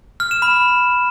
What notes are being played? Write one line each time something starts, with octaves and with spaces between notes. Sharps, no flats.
F6
E7
B5